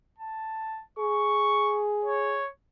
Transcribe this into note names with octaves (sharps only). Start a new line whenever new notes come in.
A5
G#4 C#6
C#5